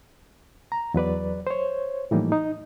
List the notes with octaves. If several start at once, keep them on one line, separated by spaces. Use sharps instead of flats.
A#5
E2 F#3 B4 D5
C5 C#5
A2 E3 F3 G3 A#3 D#4
D#4